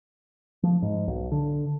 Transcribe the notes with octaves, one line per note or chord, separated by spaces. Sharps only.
F3
G#2
B1
D3